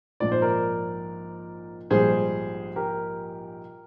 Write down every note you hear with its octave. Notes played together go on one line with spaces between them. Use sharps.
A#1 G#2 F3 D5
C5
A#4 D5
A#1 G#2 G3 G#4 C5
G4 A#4